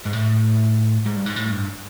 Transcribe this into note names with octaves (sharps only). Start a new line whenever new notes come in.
G#2
A2
G#2
G2
G#2
A2
G2